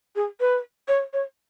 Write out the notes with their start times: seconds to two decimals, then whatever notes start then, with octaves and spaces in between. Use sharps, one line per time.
0.16 G#4
0.40 B4
0.88 C#5
1.13 C#5